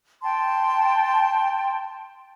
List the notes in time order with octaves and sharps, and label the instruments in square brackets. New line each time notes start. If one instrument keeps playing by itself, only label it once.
[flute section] G5 A5 C6